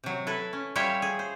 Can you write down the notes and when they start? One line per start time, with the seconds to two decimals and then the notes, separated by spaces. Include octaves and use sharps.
0.04 C3 F#3
0.27 E4 A4 B4
0.53 C#4
0.76 G3 E4 F4 C#5 E5 G5
1.02 G#4
1.19 C5